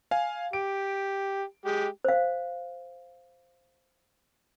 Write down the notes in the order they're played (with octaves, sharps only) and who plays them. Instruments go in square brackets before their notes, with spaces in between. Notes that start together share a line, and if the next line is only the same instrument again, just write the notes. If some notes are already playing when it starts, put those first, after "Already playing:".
[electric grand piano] F5 G#5
[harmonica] G4 [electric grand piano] D7
[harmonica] G#3 G4
[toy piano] C5 F5